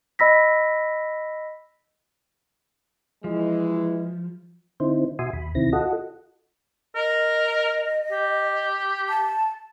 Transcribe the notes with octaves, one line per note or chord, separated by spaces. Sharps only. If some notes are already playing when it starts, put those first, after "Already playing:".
D#5 B5 E6 A#6 B6
E3 F3 G#3 E4
D3 C4 D#4 E4 C5
B2 F#4 E5 G#5 C6 D#6
D#2 B5
D2 C3 D#3 C4 E4 A#6
F4 F#4 A4 D#5 F#5
A#4 D#5
G4
A5